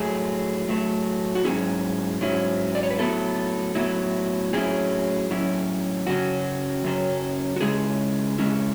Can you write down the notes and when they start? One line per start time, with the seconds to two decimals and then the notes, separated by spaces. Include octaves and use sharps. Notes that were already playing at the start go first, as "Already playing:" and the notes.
Already playing: A2 F#3 A3 G#4
0.68 A2 F#3 A3
1.35 F#4
1.44 G#2 F#3 C#4 E4 G#4
2.21 G#2 F#3 C#4 E4
2.75 D5
2.83 C#5
2.90 B4
2.98 A2 F#3 B3 E4 A4
3.75 A2 F#3 B3 E4
4.53 A2 F#3 C#4 E4 G#4
5.30 A2 F#3 C#4 E4
6.07 F#2 C#3 F#3 C#4 F#4
6.84 F#2 C#3 F#3 C#4
7.56 F#4
7.61 C#3 G#3 C#4 E4 G#4
8.38 C#3 G#3 C#4 E4